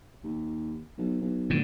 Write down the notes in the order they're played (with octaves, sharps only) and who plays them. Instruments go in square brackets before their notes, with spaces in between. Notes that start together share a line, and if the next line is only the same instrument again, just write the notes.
[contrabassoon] D#2
B1
B1
[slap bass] A2 D3